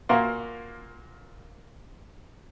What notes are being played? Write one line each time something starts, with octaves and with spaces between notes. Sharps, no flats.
A#2 A#3 F#4 A#4 C6